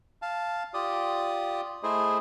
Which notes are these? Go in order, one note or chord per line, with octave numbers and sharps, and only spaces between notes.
F5 A5
F4 G4 D5 D#6
A3 E4 G#4 C5 D#5